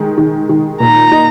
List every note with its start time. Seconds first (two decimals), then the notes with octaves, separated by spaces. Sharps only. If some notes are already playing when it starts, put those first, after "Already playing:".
Already playing: D#3 G#3
0.18 D#3
0.49 D#3
0.80 A#2 A#5
1.12 D#4